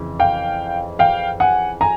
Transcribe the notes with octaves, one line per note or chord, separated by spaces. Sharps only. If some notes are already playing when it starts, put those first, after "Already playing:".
Already playing: F2 C#3 E3
F5 G5
F5 G5
F#5 G#5
G#5 A#5